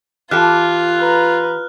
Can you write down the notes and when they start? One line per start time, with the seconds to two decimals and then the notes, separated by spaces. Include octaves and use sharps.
0.31 E3 F4 G4 A4 F6 F#6
0.99 B4 A#5